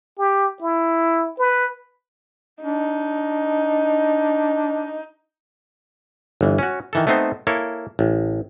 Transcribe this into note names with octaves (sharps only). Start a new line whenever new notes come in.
G4
E4
B4
D4 D#4
G1 E3
C#4 F#4
D#3 E3 A4
A3 B3 C4 D#4 C5
A#3 E4 A4 C#5
A1